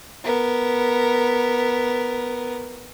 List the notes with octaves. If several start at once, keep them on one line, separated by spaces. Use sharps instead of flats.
B3 A#4